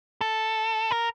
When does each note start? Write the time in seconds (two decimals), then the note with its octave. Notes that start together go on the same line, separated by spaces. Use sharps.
0.21 A4
0.91 A#4